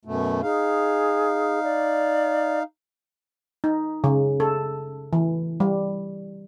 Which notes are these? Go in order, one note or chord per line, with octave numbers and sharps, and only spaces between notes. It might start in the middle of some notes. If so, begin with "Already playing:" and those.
F#2 B2 A3
D#4 G#4 F5
D5
D#4
C#3
A4
E3
G3